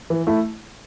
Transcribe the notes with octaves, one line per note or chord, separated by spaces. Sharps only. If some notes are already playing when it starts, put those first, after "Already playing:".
E3
A3 E4